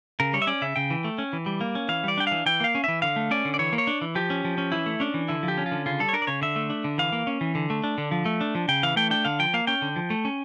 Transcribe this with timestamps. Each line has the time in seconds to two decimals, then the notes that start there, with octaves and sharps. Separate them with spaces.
0.20 C#3 A#4
0.33 G3 C#5
0.42 E5
0.47 C#4 D5
0.62 C#3 E5
0.76 C#3 G5
0.90 E3
1.04 A3
1.18 C#4
1.33 E3
1.46 G3
1.61 A#3
1.75 C#4
1.89 E3 F5
2.04 G3 D5
2.18 D4 G5
2.27 E3 F5
2.46 E3 G5
2.60 A#3 F5
2.75 C#4
2.84 E3 E5
3.02 D3 F5
3.16 A3
3.31 C#4 D5
3.45 D3
3.54 D5
3.59 E3 C#5
3.73 A#3
3.78 C#5
3.87 D4
4.02 E3
4.15 F3 G4
4.30 C#4
4.45 F3
4.58 C#4
4.72 E3 E4
4.86 A3
5.00 C#4 D4
5.14 E3
5.28 D3 E4
5.43 F3
5.48 G4
5.58 C#4
5.66 F4
5.72 D3
5.86 C#3 F4
6.00 G3 A4
6.09 C#5
6.13 D4 A#4
6.22 D5
6.27 C#3 C#5
6.42 D3 E5
6.56 A3
6.70 D4
6.84 D3
6.98 E3 F5
7.12 A#3
7.27 C#4
7.41 E3
7.55 D3
7.70 A3
7.84 D4
7.98 D3
8.11 F3
8.26 A3
8.41 D4
8.55 F3
8.68 C#3 G5
8.83 E3 F5
8.96 A3 G5
9.10 D4 G5
9.25 D3 F5
9.40 F3 G5
9.54 A#3 F5
9.67 C#4 G5
9.82 D3
9.96 F3
10.10 A3
10.25 C#4